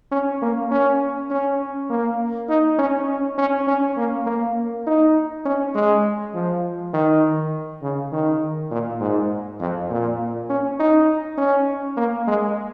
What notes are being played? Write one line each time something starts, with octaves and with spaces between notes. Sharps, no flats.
C#4
A#3
C#4
C#4
A#3
D#4
C#4
C#4
C#4
C#4
A#3
A#3
D#4
C#4
G#3
F3
D#3
C#3
D#3
A#2
G#2
F2
A#2
C#4
D#4
C#4
A#3
G#3